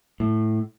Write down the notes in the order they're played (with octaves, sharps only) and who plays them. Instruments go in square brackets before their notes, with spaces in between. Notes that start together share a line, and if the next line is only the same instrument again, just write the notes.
[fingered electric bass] A2